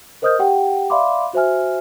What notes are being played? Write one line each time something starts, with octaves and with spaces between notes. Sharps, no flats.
A#4 C5 D#5 D#6 F6 G6
G4 F#5 G5
D5 E5 F5 B5 C6 D6
F#4 C5 E5 G#5 F6